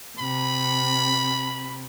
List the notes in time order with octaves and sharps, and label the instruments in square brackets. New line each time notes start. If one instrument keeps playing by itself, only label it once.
[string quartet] C3 [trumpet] B5